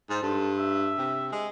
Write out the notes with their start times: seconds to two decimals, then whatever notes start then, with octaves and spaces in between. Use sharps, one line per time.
0.10 G#2 C5
0.23 G2 A4
0.58 E5
0.98 C3
1.32 G#3